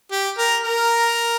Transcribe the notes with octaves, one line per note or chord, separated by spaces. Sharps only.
G4
A#4
A#4